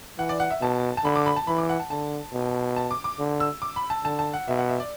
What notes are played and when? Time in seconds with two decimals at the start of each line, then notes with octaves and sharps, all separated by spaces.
0.18 E3 F#5
0.29 D5
0.40 F#5
0.50 E5
0.61 B2 A5
0.97 A5
1.04 D3 B5
1.16 D6
1.26 B5
1.36 A5
1.47 E3 B5
1.58 D6
1.69 F#5
1.80 A5
1.90 D3 A5
2.33 B2
2.76 A5
2.91 D6
3.04 D6
3.19 D3
3.40 E6
3.62 D6
3.76 B5
3.90 A5
4.04 D3 A5
4.19 A5
4.33 F#5
4.48 B2 E5
4.58 F#5
4.69 E5
4.80 D5